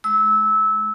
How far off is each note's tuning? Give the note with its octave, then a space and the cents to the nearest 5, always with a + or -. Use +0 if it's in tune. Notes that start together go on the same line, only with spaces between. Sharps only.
G#3 +45 E6 -20